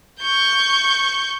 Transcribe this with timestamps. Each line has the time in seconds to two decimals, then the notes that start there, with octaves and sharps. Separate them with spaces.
0.21 C#6 G6